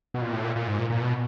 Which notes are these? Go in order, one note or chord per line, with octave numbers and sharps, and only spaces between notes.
B2
A#2
A2
A#2
A#2
G#2
A#2
A#2
B2